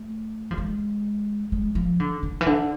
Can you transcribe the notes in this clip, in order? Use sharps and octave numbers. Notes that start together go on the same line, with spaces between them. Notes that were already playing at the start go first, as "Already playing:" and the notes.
Already playing: A3
F3
G#3
G#3
F3
D3
D3
E3
D3